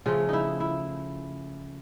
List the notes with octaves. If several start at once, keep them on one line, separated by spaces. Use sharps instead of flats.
C#3 F3 A3 F4
D#4 E4
E4